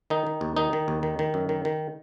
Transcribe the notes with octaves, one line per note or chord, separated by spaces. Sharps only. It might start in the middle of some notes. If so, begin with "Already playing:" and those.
D#3 D#4
D#3
D#2
D#3 D#4
D#3
D#2
D#3
D#3
F#2
D#3
D#3